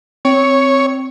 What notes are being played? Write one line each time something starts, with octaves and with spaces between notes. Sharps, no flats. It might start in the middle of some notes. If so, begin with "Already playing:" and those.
C4 C#5